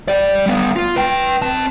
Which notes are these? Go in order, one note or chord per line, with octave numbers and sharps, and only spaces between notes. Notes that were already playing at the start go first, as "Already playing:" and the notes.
G4 D5
G3 B3
F4
B4 G5
C4 A5